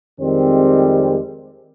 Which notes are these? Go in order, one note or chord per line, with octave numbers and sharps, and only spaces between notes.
F2 D#3 G3 G#3 C4